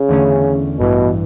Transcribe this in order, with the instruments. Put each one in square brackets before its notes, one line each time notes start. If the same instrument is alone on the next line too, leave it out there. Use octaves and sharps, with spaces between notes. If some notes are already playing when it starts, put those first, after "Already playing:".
Already playing: [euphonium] C#3
[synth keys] E2 D3 A3 C#4
[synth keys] A1 G2 E3 [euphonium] B2